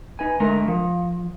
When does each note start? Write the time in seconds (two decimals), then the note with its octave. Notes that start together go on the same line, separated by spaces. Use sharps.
0.19 D#4 B4 G#5
0.40 D3 G#3 A3 A#4
0.68 F3